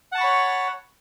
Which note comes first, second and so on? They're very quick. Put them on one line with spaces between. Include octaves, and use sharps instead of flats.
F#5 A5 C#6 B5 C#5